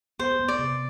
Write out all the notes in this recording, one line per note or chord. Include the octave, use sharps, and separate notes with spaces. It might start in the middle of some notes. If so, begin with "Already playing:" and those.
B3 C5
B3
D5
C3